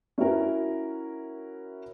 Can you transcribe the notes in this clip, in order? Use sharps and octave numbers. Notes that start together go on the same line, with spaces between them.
C#4 E4 F#4 A#4